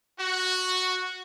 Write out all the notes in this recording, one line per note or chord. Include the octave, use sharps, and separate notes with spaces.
F#4